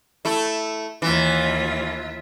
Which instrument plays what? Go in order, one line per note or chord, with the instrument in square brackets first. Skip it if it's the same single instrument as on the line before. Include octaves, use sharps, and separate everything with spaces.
[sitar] A3 E4
[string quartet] D#2 F4 E5 [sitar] E3